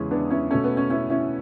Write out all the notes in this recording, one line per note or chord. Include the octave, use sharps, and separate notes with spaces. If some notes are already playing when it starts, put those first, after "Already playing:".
Already playing: E2 C#3 G#3 C#4 E4 G#4
B3 D4
C#4 E4
B2 A3 C#4
B3
C#4
C#4 E4
C#4 E4